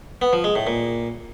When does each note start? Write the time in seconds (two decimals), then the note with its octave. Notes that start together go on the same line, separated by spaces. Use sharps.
0.22 B3
0.33 F3
0.44 G#3
0.55 A2
0.67 A#2